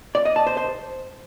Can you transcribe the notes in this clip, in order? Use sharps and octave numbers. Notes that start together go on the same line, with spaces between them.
D5
D#5
A5
C5
C5